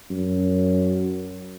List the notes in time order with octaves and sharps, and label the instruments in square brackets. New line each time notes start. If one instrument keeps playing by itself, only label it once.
[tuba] F#2